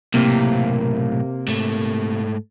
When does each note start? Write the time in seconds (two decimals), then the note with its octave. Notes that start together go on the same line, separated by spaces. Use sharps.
0.14 B1 A2 C3 A#3
1.48 G#2 A3